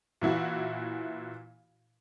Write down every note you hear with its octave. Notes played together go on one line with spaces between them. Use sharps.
A#2 E3 E4 F#4